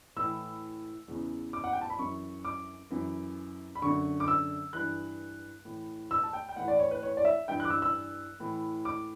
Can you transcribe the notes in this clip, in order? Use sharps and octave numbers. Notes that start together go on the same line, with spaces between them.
A2 E3 E6
E2 C#3 E3
D6
F#5
G5
A5
B5
F#2 E3 C#6
D6
F#2 E3
B5
F#2 D3 C#6
D6
E6
G2 E3 F#6
A2 E3
E6
A5
G5
G5
A2 E3 F#5
D5
C#5
B4
C#5
D5
E5
G2 E3 G5
F#6
D6
E6
E6
A2 E3
D6